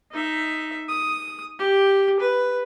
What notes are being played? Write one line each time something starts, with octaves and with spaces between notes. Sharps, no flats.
D#4 E5
D#6
G4
B4